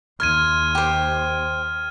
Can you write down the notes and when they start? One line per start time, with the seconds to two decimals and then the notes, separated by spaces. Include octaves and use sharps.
0.20 D#2 C6 F6 G#6 D#7
0.75 G4 C5